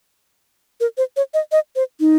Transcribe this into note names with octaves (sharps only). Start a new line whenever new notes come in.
A#4
C5
C#5
D#5
D#5
C5
D#4